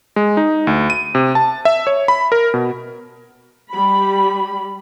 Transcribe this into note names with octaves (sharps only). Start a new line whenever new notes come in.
G#3
D#4
D2
D#7
C3
A5
E5
C#5
B5
A#4
B2
G3 B5